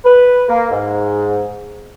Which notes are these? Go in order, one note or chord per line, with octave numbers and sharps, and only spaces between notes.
B4
A#3
G#2